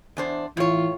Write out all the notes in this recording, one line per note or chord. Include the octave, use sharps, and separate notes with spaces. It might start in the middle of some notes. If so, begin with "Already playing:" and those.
E2 D4 C5
A2 E3 F4 C#5